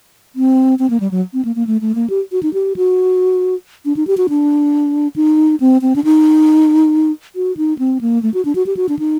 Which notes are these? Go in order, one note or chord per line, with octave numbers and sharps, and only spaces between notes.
C4
C4
A#3
G3
F#3
C4
A#3
A#3
A3
A3
A#3
G4
F#4
D#4
G4
F#4
D4
D#4
G4
F#4
D4
D#4
C4
C4
D4
D#4
F#4
D#4
C4
A#3
A3
F#4
D4
F#4
G4
F#4
D4
D#4